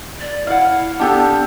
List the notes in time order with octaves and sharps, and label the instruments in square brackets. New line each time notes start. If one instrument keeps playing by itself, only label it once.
[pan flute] D5
[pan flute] E4 [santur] F5 F#5
[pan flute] B3 [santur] D4 G4 A4